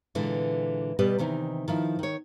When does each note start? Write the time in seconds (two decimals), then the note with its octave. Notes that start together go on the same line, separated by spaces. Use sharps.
0.15 A#2 D3 E3 G#3
0.99 B2 G3 G4 B4 D5 D#5
1.19 C3 D#3 E3 D#4
1.68 D#3 F3 E4
1.99 D#3 C#5